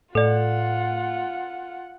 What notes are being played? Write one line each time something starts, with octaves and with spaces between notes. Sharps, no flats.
A2 F4 A4 D5 F#5